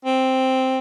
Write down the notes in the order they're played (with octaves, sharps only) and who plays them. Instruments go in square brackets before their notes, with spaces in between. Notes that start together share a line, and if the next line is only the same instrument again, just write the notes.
[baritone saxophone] C4